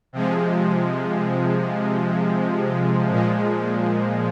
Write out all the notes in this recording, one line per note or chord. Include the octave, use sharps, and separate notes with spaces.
C3 F3 G#3
A#2 F3 G#3